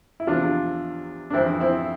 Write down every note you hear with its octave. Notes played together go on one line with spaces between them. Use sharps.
E4
E2 C3 F3 D4 F4
D4
F2 E3 C4 E4
C4 E4